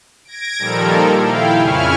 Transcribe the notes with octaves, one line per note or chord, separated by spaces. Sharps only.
G#6 A#6 D7
A#2 D#3 F3 G3 A4 A#4
E4 F5 G5
F2 C#3 E4 G#5 C#6 F6